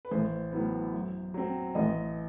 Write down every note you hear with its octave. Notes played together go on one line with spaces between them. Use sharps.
B4
A1 C5
A2 F#3 B3
F#2
F#3 C4
A1 D#5